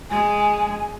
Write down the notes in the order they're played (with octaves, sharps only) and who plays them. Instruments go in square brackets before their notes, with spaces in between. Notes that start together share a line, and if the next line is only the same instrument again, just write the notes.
[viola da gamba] G#3 [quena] G#5